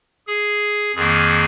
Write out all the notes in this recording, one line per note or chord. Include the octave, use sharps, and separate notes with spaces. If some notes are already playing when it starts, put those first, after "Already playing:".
G#4
F2 D#3 A#3 G#4